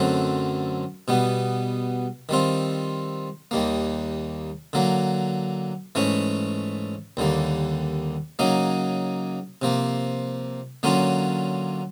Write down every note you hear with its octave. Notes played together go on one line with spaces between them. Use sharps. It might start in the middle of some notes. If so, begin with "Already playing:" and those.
Already playing: F#2 D3 F#3 A3 C4
B2 G3 B3
D#3 G3 C4 F4
D#2 D#3 G3 A#3
D3 F#3 A#3
G#2 E3 A3 C#4
D#2 D3 G3 A#3
C#3 F#3 A#3 D#4
C3 F3 A#3
D3 F#3 A#3 C#4 F4